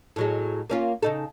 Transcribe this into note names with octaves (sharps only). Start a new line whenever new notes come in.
A2 F#3 G#3
A#3 C#4 F4
C#3 D#4 A4